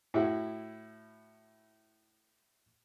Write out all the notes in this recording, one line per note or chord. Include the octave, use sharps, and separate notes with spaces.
A2 E4 F#4